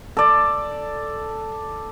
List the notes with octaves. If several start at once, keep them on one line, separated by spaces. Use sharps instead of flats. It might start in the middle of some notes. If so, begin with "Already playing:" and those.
A4 D5